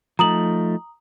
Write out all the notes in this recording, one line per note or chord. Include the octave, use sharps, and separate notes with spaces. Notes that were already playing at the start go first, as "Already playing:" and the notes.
F3 A3 D#4 A#5 D#6 F#7